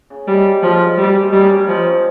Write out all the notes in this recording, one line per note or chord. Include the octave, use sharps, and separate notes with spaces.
C#3
D#3 G3
G3
F3 G#3
G#3
G3 G#3
A#3
D#4
G3 C#4
C#4
F3 D#4
C4
C#4